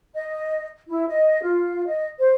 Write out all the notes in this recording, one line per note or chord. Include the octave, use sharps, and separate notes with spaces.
D#5
E4
D#5
F4
D#5
C5